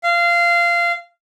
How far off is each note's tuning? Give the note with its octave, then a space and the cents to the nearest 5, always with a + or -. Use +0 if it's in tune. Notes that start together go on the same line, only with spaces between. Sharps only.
F5 -20